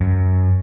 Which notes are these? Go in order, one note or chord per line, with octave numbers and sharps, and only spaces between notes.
F#2